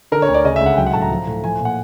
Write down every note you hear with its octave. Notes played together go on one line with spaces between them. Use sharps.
D3 A#4
C#5
D2
D5
C#3 D#5
E5
C#2
F#5
F#3 G5
F#5
A2 A5
A#5
F3
A2
F3 G#5
A#2
F#5